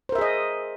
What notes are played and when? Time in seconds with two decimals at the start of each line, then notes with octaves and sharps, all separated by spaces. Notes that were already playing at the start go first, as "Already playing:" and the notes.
0.09 C5
0.12 A#4
0.15 E5
0.18 G#4
0.21 D#5